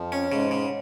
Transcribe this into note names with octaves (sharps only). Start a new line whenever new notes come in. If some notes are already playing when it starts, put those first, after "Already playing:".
Already playing: F2 F3
C#4
G#2 C#3 G#3
C#3